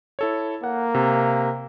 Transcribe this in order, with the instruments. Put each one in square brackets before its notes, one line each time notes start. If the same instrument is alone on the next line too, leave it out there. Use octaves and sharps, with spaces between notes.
[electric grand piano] E4 A4 C#5
[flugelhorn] A#3 [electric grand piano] F#5
[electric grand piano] C3